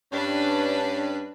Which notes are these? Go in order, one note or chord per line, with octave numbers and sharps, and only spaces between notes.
G2 C#4 D4 B4